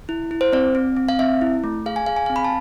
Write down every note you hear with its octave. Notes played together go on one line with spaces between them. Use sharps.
E4
E4
C5
C4 D5
C4
C4
F5
C4 E5
E4
A3
G#4 F5
G#5
G#4 F5
G#5
F5
C4
B5
A5